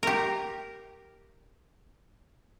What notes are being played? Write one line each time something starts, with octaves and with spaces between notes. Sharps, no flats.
G4 A#4